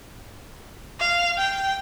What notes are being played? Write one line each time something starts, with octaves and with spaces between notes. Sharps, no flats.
F5
G5